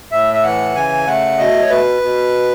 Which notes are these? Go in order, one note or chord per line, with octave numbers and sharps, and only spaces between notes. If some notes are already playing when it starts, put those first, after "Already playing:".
A2 E5
E5
E3 F#5
C#3 G#5
A3 F#5
B2 D#5
C#5
B2 B4
B2